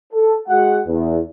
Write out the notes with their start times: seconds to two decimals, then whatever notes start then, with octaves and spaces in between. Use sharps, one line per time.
0.13 A4
0.48 G#3 F#4 F#5
0.86 E2